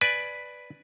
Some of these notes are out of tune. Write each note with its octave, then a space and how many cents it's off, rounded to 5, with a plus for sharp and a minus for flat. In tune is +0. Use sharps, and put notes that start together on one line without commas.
B4 +0 D5 +5 G#5 +15